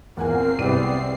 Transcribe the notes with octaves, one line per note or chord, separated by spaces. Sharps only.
E2 A#2 C4 A#4 F#5 G#5 C7
C2 G3 G#3 B3 G4 D5 D#7